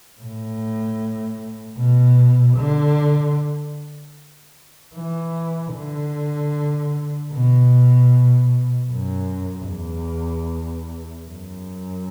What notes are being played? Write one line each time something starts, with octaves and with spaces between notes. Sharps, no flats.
A2
B2
D3
E3
D3
B2
F#2
E2
F#2